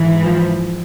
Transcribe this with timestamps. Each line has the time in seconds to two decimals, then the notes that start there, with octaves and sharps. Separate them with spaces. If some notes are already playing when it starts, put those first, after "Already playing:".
Already playing: G#2 E3
0.23 F3